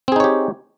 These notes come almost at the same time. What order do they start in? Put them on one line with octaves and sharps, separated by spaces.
C4 G#4 D#4 C#5 G4